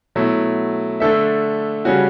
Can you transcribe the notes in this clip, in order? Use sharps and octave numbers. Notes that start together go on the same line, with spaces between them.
B2 F#3 A3 E4
D3 A3 D4 A4 E5
C#3 G3 C#4 F#4